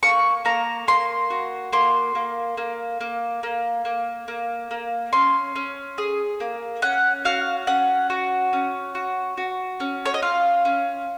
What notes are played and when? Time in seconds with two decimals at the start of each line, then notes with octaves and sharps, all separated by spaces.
0.03 A#3 C#6
0.45 A#3 A#5
0.87 A#3 C6
1.30 F#4
1.72 A#3 C6
2.15 A#3
2.57 A#3
3.01 A#3
3.43 A#3
3.85 A#3
4.28 A#3
4.71 A#3
5.13 C#4 C6
5.56 C#4
5.98 G#4
6.40 A#3
6.82 C#4 F#5
7.25 F#4 F5
7.67 C#4 F#5
8.10 F#4
8.53 C#4
8.95 F#4
9.37 F#4
9.80 C#4
10.06 C#5
10.14 D#5
10.22 F4 F5
10.65 C#4